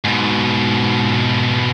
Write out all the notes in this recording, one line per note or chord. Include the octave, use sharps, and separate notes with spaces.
G#2 B2